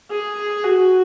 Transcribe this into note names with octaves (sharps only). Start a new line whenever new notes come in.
G#4
F#4